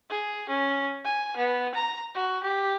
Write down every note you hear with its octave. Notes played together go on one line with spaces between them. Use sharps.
G#4
C#4
G#5
B3
A#5
F#4
G4